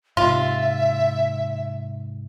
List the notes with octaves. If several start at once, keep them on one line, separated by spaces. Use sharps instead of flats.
G#2 C3 F4 E5